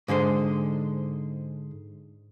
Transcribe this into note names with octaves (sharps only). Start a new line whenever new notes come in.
G#2 D3 G#3 C5